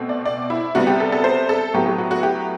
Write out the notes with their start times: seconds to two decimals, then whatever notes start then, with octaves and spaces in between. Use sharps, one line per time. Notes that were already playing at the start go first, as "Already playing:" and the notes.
Already playing: B2 A3 C4
0.09 D5
0.25 D5
0.50 E4
0.75 C3 G3 B3 F#4
0.87 G4
1.00 A4
1.12 A4
1.24 C5
1.49 A4
1.73 A2 F#3 B3 G4
1.86 G4
1.98 F#4
2.11 F#4
2.23 G4